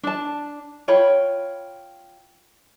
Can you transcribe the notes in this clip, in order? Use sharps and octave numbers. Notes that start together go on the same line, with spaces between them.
D4 A5
F4 C#5 G5 B5